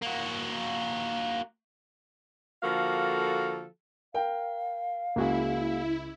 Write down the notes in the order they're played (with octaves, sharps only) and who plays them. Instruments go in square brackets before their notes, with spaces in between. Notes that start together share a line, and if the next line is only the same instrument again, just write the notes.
[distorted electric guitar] A#3 F#4
[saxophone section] D3 F3 A#3 F#4 A4 F5
[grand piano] A#4 G5 [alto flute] F5
[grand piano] C#2 [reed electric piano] A#3 F#4 G#4 [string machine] E4